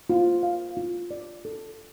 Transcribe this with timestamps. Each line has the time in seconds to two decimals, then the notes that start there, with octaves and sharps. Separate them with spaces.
0.10 F4
0.43 F5
0.77 F4
1.11 D5
1.45 A4